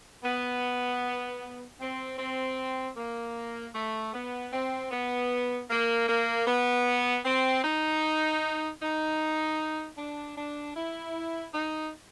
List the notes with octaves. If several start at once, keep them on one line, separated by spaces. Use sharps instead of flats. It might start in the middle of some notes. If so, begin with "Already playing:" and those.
B3
C4
C4
A#3
A3
B3
C4
B3
A#3
A#3
B3
C4
D#4
D#4
D4
D4
E4
D#4